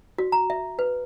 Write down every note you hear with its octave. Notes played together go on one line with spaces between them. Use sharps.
F#4
A#5
E5
B4